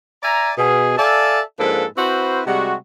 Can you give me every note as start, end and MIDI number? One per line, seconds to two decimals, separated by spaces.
0.23 0.52 74
0.23 0.52 76
0.23 0.52 80
0.23 0.52 82
0.57 0.97 47
0.57 0.97 68
0.98 1.41 69
0.98 1.41 74
0.98 1.41 76
0.98 1.41 77
0.98 1.41 80
0.98 1.41 81
1.59 1.85 44
1.59 1.85 53
1.59 1.85 58
1.59 1.85 62
1.59 1.85 69
1.59 1.85 71
1.98 2.42 60
1.98 2.42 64
1.98 2.42 66
1.98 2.42 71
1.98 2.42 72
2.47 2.75 48
2.47 2.75 55
2.47 2.75 56
2.47 2.75 66